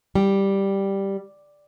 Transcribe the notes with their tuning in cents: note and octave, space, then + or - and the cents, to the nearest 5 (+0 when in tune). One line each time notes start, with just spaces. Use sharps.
G3 +0 G5 +0